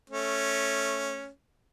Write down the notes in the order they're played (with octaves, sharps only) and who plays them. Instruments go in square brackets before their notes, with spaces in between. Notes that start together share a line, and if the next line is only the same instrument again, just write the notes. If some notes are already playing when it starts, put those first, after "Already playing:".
[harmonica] A3 C#4